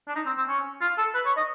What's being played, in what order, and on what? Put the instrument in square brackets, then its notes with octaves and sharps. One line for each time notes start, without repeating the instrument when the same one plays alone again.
[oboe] D4
D#4
C4
C4
C#4
F4
A4
B4
C#5
D#5